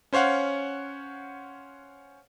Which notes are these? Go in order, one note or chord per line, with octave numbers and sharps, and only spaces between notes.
C#4 C5 C#5 F5 F#5